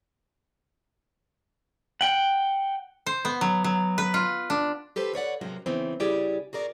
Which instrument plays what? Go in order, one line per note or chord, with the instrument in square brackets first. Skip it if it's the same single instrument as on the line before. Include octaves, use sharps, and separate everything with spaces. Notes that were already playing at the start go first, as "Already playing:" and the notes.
[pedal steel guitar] F#5 G5
[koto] C5
B3
F#3
F#3
B4
F4
D4
[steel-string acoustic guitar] G4 A4 B4 C5
B4 C#5 D5 F#5
A2 C3 F#3 G#3 A#3 F#4
C#3 E3 B3 C4
C#3 G3 E4 G4 G#4 D5
F#4 G#4 A#4 D5